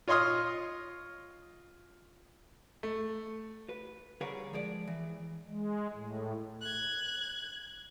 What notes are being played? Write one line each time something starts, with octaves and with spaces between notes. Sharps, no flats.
F4 C#5 D#5 C6 D#6 F6
A3
B4
D3 G3 G#4 A#4 B4 C#5
F3 G#3 G#4 D5
E3
G#3
A2
F#6 G#6